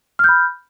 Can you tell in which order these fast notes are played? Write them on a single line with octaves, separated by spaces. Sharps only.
F6 G6 B5